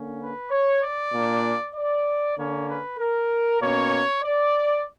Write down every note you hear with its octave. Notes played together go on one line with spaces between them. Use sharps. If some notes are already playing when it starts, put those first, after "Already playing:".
Already playing: D3 A#3 C#4
B4
C#5
D5
A#2 A#3 D4
D5
D3 A#3 C#4 C#5
B4
A#4
B2 A#3 C#4 C#5
D5